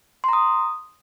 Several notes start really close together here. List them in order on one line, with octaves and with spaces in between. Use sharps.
C6 A#5 D#6